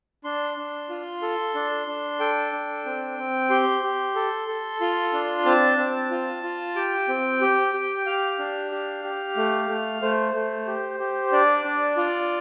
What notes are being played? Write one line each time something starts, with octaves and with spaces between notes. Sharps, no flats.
D4 C6
D4
F4
A4
D4
D4
A4 G5
D4
C4
C4
G4 C6
G4
A4
A4
F4 C6
D4
C4 A5
C4
F4
F4
G4 G5
C4
G4
G4
G4 F5
D4
G4
G4
A3
A3
A3 C5
A3
G4
G4
D4 D5
D4
F4 D5